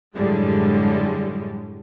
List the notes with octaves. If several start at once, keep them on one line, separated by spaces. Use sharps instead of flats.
F#2 A2 D3 G3 G#3